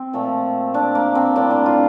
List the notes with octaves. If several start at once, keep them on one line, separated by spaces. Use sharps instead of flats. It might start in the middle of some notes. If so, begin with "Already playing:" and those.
Already playing: C4
A#2 F3 A3
D4
A#3
C4
A2 G3 A#3 D4
D4
F4